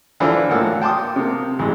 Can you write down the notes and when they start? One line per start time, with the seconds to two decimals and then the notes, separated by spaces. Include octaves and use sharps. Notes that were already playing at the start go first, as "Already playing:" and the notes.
0.20 D3 E3 D4 F4 A4 C5
0.49 G#1 A2 A#3 F#5 E6
0.82 G5 A5 C6 D6 D#6
1.16 C3 A#3
1.59 A1 E3 G#3